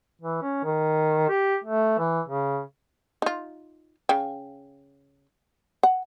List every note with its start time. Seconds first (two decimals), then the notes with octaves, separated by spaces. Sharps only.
0.21 E3
0.42 C#4
0.63 D#3
1.29 G4
1.64 A3
1.98 E3
2.28 C#3
3.22 D#4 F4
4.09 C#3 G5
5.83 F#5